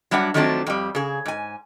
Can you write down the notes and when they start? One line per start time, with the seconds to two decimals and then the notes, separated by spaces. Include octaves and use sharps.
0.11 F#3 G3 D4 E5 F#5
0.34 D#3 F3 F#3 A3 C4 D4
0.66 F2 G3
0.95 C#3 G#4
1.26 G#2 G#5